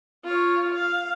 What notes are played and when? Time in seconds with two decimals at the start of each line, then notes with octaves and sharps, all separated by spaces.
0.24 F4 C#5
0.74 F5